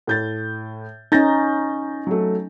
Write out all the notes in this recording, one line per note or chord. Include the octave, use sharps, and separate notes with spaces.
A2 G6 A6
C#4 D#4 G6 A6 A#6
F#3 A3